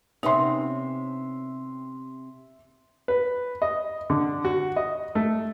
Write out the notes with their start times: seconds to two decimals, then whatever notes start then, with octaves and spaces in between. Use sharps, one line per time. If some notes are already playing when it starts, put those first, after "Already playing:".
0.23 C3 B3 C#4 D#4 E5 C6
3.08 B4
3.62 D#5
4.10 D3
4.45 F#4
4.76 D#5
5.15 A3